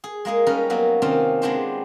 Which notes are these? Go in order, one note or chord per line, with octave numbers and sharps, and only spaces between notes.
G#4
G#3 A#3 G#4 D#5
G3 C#4 D#4 A#4 B4
F#3 A#3 B3
C3 D#3 C4 C#4 F4
G#3 B3 C4 D4 G4 C5